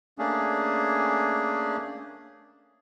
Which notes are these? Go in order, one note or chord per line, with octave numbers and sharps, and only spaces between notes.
A3 A#3 C#4 D4 G#4